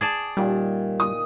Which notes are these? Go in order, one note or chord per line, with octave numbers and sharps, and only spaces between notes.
G#4 D5 A5
A#2 D#3 G3
D#6